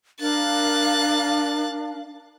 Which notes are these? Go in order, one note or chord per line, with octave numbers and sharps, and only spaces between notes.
D4 A#4 F5 F#6 A6